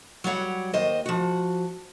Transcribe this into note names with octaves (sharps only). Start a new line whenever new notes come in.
F#3 G3 C#5 F#5
D#2 C5 D#5
F3 F#4